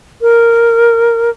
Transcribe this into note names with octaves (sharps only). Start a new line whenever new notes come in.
A#4